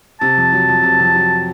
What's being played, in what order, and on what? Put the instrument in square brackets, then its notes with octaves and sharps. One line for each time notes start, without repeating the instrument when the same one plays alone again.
[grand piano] C3 [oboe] A5
[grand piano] F2
F#3
F2
C3
F2
F#3